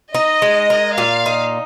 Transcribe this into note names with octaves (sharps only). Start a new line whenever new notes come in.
D#4 D#5
G#3
A#4
A#2 F5
D#4